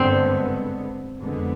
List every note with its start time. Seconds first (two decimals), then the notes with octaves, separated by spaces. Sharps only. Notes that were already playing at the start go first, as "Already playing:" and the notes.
Already playing: G2 D3 G#3 B3 C4
1.19 F2 D3 G#3 B3